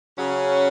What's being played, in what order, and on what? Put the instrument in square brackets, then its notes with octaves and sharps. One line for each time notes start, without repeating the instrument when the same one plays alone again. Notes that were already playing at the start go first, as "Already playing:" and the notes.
[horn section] C#3 F#3 C#4